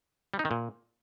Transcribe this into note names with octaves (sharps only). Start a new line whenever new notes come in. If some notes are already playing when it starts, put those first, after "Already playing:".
G3
D#4
D#3
A#2